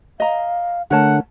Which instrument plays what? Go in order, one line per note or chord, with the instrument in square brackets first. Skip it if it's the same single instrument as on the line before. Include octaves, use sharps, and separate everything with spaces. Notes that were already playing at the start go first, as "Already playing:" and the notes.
[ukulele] D#5 A#5 [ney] F5
[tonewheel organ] D3 [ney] A3 [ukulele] A#4 C#5 A5 [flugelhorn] F#5